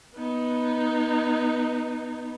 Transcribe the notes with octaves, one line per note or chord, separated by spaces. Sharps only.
B3 D#4